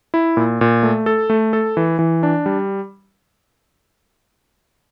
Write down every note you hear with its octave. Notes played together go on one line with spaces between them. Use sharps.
E4
A#2
A#2
A3
A4
A3
A4
E3
E3
D4
G3